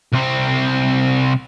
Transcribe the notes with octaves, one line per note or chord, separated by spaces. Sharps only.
C2 C4